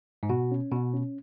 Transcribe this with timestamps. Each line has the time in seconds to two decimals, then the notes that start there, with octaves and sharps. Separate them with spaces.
0.23 G#2
0.29 B2 F#4
0.51 C#4
0.72 B2 F#4
0.94 C#4